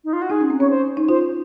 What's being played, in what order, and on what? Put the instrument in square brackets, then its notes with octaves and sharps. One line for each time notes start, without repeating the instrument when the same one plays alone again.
[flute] D#4
F4
F#4
[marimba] D#4 [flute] G#4
[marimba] C#4
C4
[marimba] C#4 [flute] C#5
[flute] C5
[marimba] D#4
[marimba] F4 [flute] C5